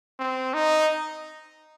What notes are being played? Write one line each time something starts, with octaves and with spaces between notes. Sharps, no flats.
C4
D#4